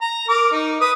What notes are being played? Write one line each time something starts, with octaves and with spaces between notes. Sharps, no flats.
A#5
A#4 D6
D#4
B4 D#6